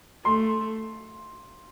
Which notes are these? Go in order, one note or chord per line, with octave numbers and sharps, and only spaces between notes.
A3 C6